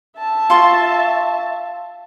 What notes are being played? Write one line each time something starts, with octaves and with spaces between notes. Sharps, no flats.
E5 A5
F4 C6 C#6